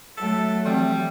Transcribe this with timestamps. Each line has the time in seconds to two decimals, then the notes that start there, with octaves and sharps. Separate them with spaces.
0.18 F#3 A3 A4
0.65 E3 F3 G3 C4